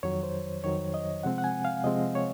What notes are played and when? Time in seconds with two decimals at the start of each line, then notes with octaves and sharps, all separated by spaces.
0.03 F2 D#3 F#3 C#5
0.23 C5
0.64 F2 D#3 F#3 C#5
0.94 D#5
1.23 C3 F3 G#3 C4 F#5
1.38 F#5
1.44 G#5
1.65 F5
1.84 C3 F3 G#3 C4 D#5
2.15 C#5